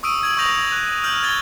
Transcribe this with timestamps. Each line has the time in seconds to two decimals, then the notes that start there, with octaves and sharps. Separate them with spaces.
0.03 C#6 D#6 E6 D7 D#7
0.21 D#6 G#6 F#7
0.37 C#6 D#6 G6 A#6 F7 F#7
0.72 F#6
1.04 F6 G6 F#7
1.23 G#6 A6 G7